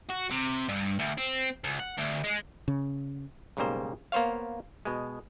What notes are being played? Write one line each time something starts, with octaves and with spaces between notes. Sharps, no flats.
F#4
C3
G2
D2
C4
C#2
F#5
D2
G#3
C#3
B1 G#2 C#3 G3 A#3 C5
A#3 B3 C5 C#5 F5
B2 G#3